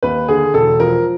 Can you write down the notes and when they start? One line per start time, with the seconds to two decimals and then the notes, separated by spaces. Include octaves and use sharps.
0.03 D#2 B4
0.28 D3 G#4
0.54 E1 A4
0.80 F3 A#4